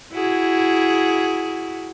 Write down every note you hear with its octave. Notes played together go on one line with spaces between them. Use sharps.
E4 F#4 G#4